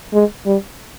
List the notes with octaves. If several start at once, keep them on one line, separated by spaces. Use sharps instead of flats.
G#3
G3